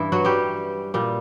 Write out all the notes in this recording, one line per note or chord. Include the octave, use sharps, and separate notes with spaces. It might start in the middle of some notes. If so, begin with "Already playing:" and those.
Already playing: G2 E3 E4
F#3 F#4
G3 G4
A#2 G3